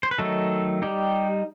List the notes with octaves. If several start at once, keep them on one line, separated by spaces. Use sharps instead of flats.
C5
B4
D#3 F#3 A3 D#4 A4
G3 D#4 G4